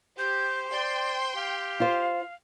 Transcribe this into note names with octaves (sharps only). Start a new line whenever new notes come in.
G4 C5 G6
D5 G5 C6 G6
G4 F5
F4 C5